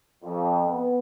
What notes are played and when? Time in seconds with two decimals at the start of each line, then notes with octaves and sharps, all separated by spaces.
0.23 F2
0.66 B3